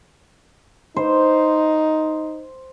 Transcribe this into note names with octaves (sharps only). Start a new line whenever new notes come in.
D#4 C5